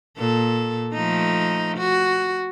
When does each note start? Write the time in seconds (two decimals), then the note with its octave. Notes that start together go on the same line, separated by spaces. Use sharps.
0.18 A#2 A4
0.93 F3 A3 D#4
1.78 F#4